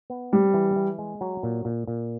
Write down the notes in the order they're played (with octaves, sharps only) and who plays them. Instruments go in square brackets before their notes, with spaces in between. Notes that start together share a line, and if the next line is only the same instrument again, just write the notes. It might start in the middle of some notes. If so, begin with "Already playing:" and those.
[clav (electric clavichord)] B3
[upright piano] G3 [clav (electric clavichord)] C4
[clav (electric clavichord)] E3
E3
G#3
F#3
A#2
A#2
A#2